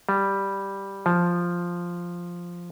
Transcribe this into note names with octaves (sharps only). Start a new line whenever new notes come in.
G3
F3